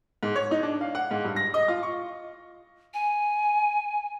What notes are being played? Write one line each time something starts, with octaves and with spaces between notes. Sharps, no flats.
G#2
C#5
D#4
D4
F5
F#5
G#2
G2
A#6
D#5
F4
C#6
G#5